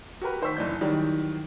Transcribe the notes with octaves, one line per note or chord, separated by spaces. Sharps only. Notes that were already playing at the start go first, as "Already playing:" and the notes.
F#4 G4 A#4 B4
D#3 C5 C#6 E6 B6
F#1 E3 D4 G6
D#3 E3 F#3 G3